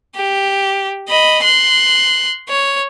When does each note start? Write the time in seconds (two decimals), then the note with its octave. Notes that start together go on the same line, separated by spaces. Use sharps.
0.16 G4
1.09 D#5 B5
1.43 C6 F#6
2.49 C#5